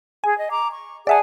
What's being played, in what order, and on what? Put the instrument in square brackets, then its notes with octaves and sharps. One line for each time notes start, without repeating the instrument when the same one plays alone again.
[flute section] G#4 [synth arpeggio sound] G#5
[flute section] D#5
A#5 D6
C#6
[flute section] G#4 F#5 G#5 [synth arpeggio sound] D5 E5 A5